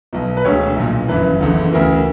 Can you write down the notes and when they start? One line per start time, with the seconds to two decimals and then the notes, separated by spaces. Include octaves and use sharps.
0.13 B1 B2
0.37 B4
0.44 E1 D2 D3 C#5
0.76 B1 A#2
1.08 G1 F#2 E3 B4
1.40 F#1 E2 D3
1.72 D2 C#3 E3 A#4